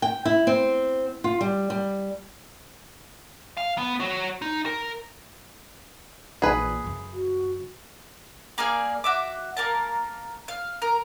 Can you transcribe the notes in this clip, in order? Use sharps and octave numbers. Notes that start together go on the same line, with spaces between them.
G5
E4
C4
F4
G3
G3
F5
B3
F#4 C#5
D#4
A#4
A#1 E3 G#4 B4
F#2 C#3
F#4
A#3 G#4 D5 F5
F#4 E5 D6
A#3 A#4 A5
F5
A#4